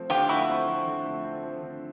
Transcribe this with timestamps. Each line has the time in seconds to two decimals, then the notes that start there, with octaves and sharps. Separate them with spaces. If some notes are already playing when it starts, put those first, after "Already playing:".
Already playing: F3 A3 C4
0.10 D3 F4 G4
0.29 A3 E4 F#4
0.49 C4
0.68 F3
0.87 D3
1.05 A3
1.24 C4
1.43 F3
1.62 D3